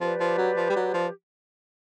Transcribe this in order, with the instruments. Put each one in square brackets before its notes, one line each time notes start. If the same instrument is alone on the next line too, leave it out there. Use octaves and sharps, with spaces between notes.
[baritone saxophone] F3 [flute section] G4 B4 D5
[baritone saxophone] F3
F#3
F3
G3
F#3
F3